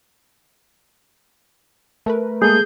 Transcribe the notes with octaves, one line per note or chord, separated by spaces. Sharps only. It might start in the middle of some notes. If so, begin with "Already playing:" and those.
A3 A#4 B4
G#3 A#3 G#4 A4 G6